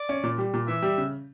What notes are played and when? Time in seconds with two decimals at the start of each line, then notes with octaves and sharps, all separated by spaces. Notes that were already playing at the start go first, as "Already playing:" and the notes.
Already playing: D5
0.09 C#4
0.23 A#2
0.38 G3
0.54 A#2
0.68 E3 E5
0.82 G3
0.98 C#3